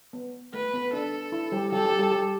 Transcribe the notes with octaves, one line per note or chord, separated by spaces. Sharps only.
B3
A3 B4
B3
D4 A4
E4
G3 G4
G3 G4 A4
G3 G4
G3 G4
G3 G4